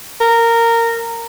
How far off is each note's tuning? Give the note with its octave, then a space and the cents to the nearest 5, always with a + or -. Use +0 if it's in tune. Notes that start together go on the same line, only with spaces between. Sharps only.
A#4 -15